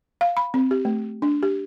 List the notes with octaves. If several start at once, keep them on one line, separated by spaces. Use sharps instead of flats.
F5
B5
C4
G4
A3
D4
G4